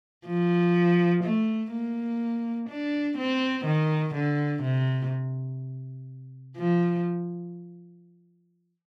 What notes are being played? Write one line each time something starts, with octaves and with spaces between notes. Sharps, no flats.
F3
A3
A#3
D4
C4
D#3
D3
C3
F3